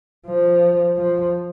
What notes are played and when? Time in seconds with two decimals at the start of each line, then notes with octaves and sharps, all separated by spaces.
0.27 F3
0.97 F3